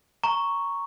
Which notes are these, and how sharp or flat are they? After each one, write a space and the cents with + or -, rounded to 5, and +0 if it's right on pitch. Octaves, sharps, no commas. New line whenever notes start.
A#5 -5 C#6 +0